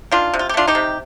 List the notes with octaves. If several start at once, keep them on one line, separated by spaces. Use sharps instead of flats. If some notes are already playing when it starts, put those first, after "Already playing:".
D#3 D4 F4
C3
F4
G4
A3 D4 F4
D#4 G4
C3